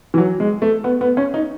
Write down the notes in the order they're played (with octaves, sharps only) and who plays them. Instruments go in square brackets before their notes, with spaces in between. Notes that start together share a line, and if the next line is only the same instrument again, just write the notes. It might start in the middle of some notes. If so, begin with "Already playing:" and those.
[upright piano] E3
F#3
G#3
A3
B3
B3
C#4
D#4